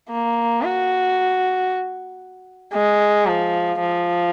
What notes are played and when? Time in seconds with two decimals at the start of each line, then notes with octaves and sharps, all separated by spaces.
0.10 A#3
0.63 F#4
2.73 G#3
3.26 F3
3.80 F3